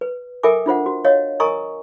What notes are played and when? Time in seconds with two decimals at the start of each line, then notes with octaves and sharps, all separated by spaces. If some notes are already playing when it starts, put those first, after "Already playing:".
0.01 B4
0.43 A4 A#4 E5 G5 G#5 D6
0.66 D4 F4 C5 F#5
0.86 F#4
1.05 C#5 D#5 F5
1.40 A#4 D#5 G#5 A#5 C#6 D#6